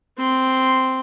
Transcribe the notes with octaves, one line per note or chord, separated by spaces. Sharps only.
C4 C6